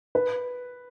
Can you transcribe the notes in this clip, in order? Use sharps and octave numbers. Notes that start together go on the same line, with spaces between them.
B4